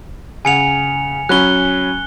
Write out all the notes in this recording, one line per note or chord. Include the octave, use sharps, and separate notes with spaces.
C#3 F#5 G#5 C#7 F7
F#3 C#4 B5 F#6 G7